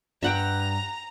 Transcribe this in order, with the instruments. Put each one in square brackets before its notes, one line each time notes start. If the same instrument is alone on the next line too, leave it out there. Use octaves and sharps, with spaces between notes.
[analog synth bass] G2 [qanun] E5 F#5 G5 [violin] A#5